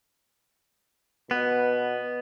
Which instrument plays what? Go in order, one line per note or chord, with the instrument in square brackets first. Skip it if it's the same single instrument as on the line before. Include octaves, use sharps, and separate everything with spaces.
[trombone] B2 [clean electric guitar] B3